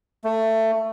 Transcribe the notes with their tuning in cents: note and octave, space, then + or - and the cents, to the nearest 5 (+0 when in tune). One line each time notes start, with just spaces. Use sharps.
A3 +20